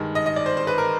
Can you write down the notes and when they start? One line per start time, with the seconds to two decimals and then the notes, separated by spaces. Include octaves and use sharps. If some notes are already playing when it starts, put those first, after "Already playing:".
Already playing: G2 D#3 G#3
0.15 D#5
0.26 D#5
0.36 D5
0.46 C5
0.57 C5
0.67 B4
0.78 A#4